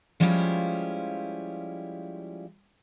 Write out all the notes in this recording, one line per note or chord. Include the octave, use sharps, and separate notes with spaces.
F3 G3 G#3 C#4 E4 F4